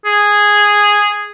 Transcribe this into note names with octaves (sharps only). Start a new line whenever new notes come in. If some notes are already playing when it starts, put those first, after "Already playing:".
G#4